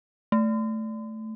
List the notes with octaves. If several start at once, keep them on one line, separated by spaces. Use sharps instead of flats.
A3